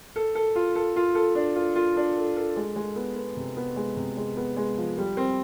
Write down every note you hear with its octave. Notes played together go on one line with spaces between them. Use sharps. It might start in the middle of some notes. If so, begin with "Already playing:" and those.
A4
A4
F4
A4
F4
A4
D4
F4
F4
D4
A4
A4
G#3
G#3
B3
B3
C3
B3
G#3
C3
G#3
B3
G#3
F3
G3
C4